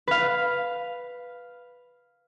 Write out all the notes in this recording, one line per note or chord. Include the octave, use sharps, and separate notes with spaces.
B4 F5